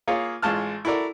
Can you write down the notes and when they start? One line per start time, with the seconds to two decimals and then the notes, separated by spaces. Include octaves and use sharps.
0.08 A#3 F4 G#4 C#5
0.42 A1 G#3 F4 A5 F6
0.85 E4 F#4 A4 A#4 D5